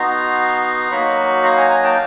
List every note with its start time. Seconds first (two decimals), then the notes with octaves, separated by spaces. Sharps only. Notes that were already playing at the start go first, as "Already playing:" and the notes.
Already playing: B3 D#4 F#4 A#5 C6
0.91 F#3 A#3 D#4 F#4 B5 C#6
1.44 A#5 C6
1.57 G#5 A#5
1.70 G#5 A#5
1.83 G5 A5